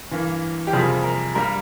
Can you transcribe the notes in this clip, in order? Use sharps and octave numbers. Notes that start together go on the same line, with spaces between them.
G2 E3 A#3
G4
F2 C3 G3 A#3 G#4
A#4
G2 G3 A#3 A#4